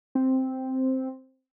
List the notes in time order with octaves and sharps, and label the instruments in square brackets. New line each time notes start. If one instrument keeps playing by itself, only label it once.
[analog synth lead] C4